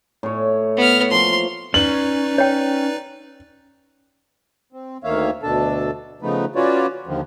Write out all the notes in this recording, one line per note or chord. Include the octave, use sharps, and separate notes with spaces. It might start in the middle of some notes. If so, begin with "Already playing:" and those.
A2 C#5
B3 F6
F3 A#3 C6
C#4 D#4 B4 D5 F#7
C#5 G5
C4
D2 D#3 A#3 C#5 E5 F5
D2 B2 D4 A4 A5
C#3 F3 A3 B3 D#4 B4
C#4 F4 F#4 B4 C#5 D5
D#2 D3 D#3 F3